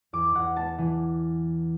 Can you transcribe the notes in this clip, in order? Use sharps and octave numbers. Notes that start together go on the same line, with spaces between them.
E2 D6
E2 F#5
B3 A5
E3